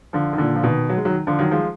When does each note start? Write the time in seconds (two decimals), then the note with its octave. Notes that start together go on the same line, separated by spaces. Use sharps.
0.13 D3 F3
0.33 D#3
0.38 A#2 D3
0.56 F3
0.63 B2 D#3
0.89 F#3
0.97 G#3
1.05 D#3 F#3
1.27 D3 F3
1.39 D#3 F#3
1.51 F3 G#3